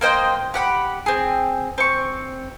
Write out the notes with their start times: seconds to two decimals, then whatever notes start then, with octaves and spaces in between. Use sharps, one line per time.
0.01 A#3 C5 D#5 G5
0.54 G4 F#5 B5
1.06 C4 G#4
1.78 C4 C#6